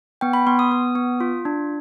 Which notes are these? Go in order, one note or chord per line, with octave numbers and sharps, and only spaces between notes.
B3 G5
B5
B3 C6
D#6
B3
B3
F4
D4